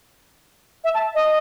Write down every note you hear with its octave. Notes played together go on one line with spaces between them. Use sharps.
E5
A5
D#5